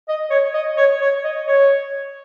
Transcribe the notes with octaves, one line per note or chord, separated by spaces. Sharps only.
D#5
C#5
D#5
C#5
C#5
D#5
C#5